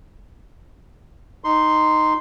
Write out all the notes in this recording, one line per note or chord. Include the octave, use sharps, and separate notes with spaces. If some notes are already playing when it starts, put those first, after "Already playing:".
D#4 C6